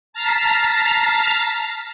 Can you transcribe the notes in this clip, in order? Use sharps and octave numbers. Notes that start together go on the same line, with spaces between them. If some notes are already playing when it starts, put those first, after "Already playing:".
A5 A#5 F6 A6 B6 C7